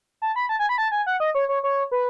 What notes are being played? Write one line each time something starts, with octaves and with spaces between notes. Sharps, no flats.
A5
B5
A5
G#5
B5
A5
G#5
F#5
D#5
C#5
C#5
C#5
B4